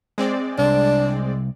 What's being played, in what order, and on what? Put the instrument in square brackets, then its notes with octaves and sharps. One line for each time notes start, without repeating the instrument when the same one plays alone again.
[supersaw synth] G#3 C4 D5
[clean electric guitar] C2 [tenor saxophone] D4